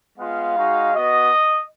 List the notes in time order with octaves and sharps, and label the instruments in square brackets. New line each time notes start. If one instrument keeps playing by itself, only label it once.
[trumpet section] G#3 B3 F4 F5
G#3 D#4 F#4
B3 F#4 D#5